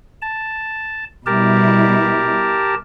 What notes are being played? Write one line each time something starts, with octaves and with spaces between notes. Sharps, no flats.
A5
B2 G3 E4 G4 A#4 A5